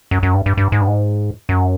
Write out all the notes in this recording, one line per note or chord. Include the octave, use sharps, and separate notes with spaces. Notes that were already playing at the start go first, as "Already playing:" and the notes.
F#2
F#2
G2
G2
G2
G#2
G2
G#2
F#2